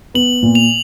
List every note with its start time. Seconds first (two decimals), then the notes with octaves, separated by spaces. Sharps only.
0.14 B3 F#7
0.43 A#2
0.55 F7